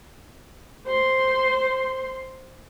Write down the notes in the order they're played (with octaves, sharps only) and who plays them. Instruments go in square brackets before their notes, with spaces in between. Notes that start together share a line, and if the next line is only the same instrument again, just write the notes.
[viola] C5 C6